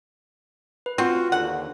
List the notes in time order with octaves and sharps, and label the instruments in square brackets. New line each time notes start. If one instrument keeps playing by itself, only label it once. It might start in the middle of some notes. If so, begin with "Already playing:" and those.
[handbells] B4
[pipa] C4 [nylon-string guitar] F4 [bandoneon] F#4
[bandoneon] D#2 D3 [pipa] F#5